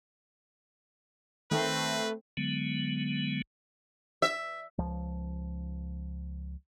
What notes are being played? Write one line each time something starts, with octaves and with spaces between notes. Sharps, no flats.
D#3 A3 C4 B4
D3 F#3 G#3 B3
E5
C#2 F3